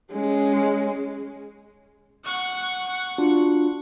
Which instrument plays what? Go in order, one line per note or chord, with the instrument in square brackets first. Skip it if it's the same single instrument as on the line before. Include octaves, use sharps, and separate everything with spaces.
[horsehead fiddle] G#3 C#4
[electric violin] F#5 C#6
[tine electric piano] D4 F4 F#4